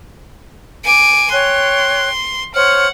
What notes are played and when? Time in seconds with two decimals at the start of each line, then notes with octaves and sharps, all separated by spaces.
0.84 G#5 D6
1.31 C#5 G5 C6 F#6
2.55 C5 C#5 F#5 F6